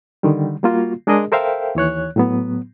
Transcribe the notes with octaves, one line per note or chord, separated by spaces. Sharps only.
D3 D#3 G3
G3 A#3 F4 F#4
G#3 D4 G#4 A#4 D#5
A4 A#4 C5 E5 F5 G5
D#2 E3 C#5 F#6
A2 F#3 B3